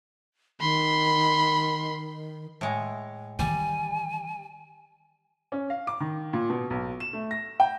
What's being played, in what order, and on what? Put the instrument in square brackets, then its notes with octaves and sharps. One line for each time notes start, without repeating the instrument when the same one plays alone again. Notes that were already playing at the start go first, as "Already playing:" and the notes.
[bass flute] D#3 [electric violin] B5 C6
[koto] A2 G#3
[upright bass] D#3 E3 [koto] G3 [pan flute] G#5
[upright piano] C#4
F5
D6
D#3
A#2
B2
B1
E7
A3
A#6
G5